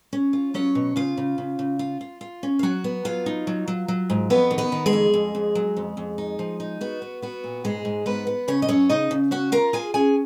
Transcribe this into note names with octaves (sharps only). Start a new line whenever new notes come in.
C#4
F4
F#3 C#4 C#5
B2
C#3 F4 F5
C#3
C#3
C#3
F4
F4
F4
C#4
F5
F#3 F#4 F#5
B3
F#3 F4 F5
D#4
F#3
F#3
F#3
G#2
F2 B3 B4
D#3
B3 B4
D#3
G#3 G#4
F2
F2
F2
F#3
F2
F2
D#4
F3
D#4
B3 F#4
B3
B3 F#4
A#2
G#2 G#3 G#4
G#2
G#2 B3 B4
B3
C#3 C#4 C#5
D#5
F#2 C#4 C#5
C#3 D#4 D#5
C#3
C#4 F#4 F#5
F4 A#4 A#5
F4 G#4 G#5
C#4 G#4 G#5